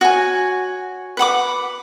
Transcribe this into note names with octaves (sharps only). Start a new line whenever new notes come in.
F#4 C#5 G#5
B4 F#5 B5 D6